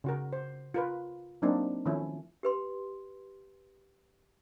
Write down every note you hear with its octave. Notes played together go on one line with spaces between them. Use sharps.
C#3 F#4 A#4
C5
F4 A#4 B4
F#3 A#3 C4 D4 D#4
D#3 F3 A3 C#4 E4
G4 B4 C6